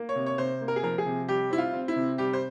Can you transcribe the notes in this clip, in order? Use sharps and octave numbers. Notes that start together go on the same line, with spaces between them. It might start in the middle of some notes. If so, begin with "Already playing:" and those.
Already playing: A#3
C#5
C3
C#5
C3 C5
A#3
A#4
G#4
F3 A#4
G#4
C3
G3 G4
C4 E4
F4
C4
E4
C3
G3 G4
C5